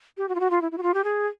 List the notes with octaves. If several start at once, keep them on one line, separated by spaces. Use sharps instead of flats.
G4
F#4
F4
F#4
F4
E4
E4
F#4
F4
G4
G#4